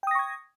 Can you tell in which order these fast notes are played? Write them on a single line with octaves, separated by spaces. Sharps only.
G5 D#6 A#6 C#6 G#6